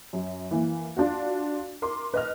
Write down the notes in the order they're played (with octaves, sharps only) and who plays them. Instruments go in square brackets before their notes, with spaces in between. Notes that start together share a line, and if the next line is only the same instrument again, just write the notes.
[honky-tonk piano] F#2
E3 A#3
D4 F4 F#4
A#4 C6 D6
B4 D#5 F6